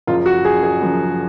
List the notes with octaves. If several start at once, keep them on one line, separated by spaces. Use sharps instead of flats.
F#1 F#2 F3 F4
F#4
G#4
G#4
F#1 F#2 F3